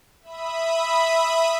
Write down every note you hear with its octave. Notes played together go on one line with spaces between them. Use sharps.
E5 B5 D#6